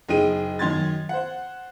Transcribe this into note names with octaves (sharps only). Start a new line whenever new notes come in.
F#1 D#4 G#4 G5 D#7
F#2 D#3 C6 G#6 A6
C5 F#5